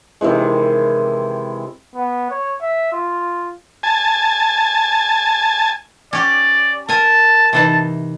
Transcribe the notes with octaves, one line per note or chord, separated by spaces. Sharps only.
C3 D#3 E3 G#3
B3
C#5
E5
F4
G#5 A5
C#4 G4 D5
A#4 G#5 A5
C3 E3 D#4